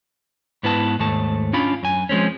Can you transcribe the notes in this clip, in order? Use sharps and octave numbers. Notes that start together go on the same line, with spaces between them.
G#2 B3 E4 B4 A5
D#2 G#2 A3 A5
C#4 D4 F4 B5
F#2 G#5
F3 G#3 C4 C#4